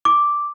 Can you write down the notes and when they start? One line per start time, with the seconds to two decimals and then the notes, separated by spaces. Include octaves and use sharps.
0.05 D6